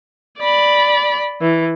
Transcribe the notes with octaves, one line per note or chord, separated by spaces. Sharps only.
D5 B5
E3